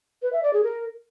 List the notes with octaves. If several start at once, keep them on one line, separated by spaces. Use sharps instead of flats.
B4
E5
D5
G#4
A#4